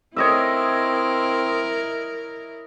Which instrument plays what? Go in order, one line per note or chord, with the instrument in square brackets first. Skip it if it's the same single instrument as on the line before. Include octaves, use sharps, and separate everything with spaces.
[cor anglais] C4 [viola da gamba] E4 A#4 [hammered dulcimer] C#5 D#5 E5